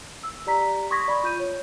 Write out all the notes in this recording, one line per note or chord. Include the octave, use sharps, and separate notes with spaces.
E6
G4 D5 A#5 B6
C6 C#6 D#6 G#6 A#6 B6
D5 B5 C#6
F4 G6 D#7
C#5